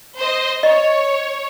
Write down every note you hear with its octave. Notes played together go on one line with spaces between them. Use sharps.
C5 D#5
C#5 D#5